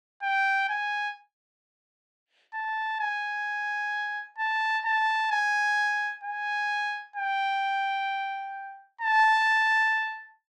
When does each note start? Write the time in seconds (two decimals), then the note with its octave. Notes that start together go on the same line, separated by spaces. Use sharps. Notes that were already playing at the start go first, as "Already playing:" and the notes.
0.23 G5
0.69 G#5
2.54 A5
3.00 G#5
4.38 A5
4.85 A5
5.31 G#5
6.24 G#5
7.16 G5
9.01 A5